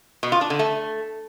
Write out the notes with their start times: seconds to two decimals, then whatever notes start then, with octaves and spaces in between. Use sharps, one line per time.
0.23 B2
0.32 F4
0.41 D4
0.50 D3
0.59 A3